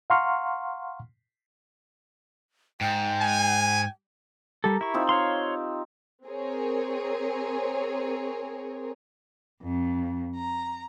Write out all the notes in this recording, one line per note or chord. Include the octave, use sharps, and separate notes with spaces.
F5 F#5 A#5 C6 C#6 F6
G#2 G5
G#5
G3 G4 A4 A#4
E4 C#6
C4 D#4 F4
C#5 F5 C6
C4 G#4 A#4 C#5
F2
A#5